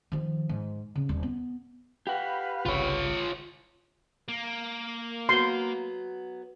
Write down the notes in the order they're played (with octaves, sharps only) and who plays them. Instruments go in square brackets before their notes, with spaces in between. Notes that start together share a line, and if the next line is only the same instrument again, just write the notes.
[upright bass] D#3 F3
G#2
C#3
D#1 G3
B3
[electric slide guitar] G4 F#5 [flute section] B4 F5 B5
[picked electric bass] G1 C2 C#3 [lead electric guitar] F4 C#5
[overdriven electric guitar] A#3
[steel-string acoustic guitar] F#3 B3 [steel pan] C6